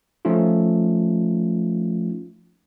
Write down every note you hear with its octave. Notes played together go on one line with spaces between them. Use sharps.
F3 A3 C#4 D#4 F4